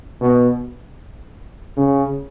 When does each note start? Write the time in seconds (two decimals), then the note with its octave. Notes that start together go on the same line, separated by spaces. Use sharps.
0.21 B2
1.77 C#3